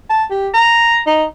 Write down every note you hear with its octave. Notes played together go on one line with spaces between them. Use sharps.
A5
G4
A#5
D#4